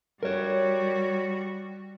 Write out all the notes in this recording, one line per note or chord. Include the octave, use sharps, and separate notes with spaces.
G3 F#4 A#4 C#5